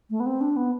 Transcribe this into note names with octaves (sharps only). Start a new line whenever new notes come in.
A3
B3
C4
D4
B3